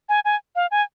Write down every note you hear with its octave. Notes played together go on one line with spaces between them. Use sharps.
G#5
G#5
F5
G#5